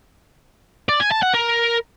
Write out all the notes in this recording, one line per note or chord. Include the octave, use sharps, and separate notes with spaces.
D5
G#5
A5
F#5
A#4